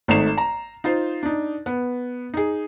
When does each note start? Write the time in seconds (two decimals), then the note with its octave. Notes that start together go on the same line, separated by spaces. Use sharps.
0.08 G#1 A3 D#4 C7 E7
0.37 A#5
0.84 D#4 F4 C5
1.23 D4 D#4
1.66 B3
2.34 D#4 G#4